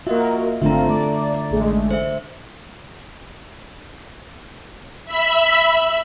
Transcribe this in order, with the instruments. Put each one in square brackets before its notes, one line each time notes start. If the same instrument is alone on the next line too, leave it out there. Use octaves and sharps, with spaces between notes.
[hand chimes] A#3 D#5 E5 [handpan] F4 [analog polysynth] F#4 A#4
[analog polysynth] G#1 C4 F4 [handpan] D3 A3 D4 [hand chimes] E5 A#5
[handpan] A3 [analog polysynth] D5
[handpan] D5
[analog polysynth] A1 G#3 A3
[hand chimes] C5 E5
[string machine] E5 B5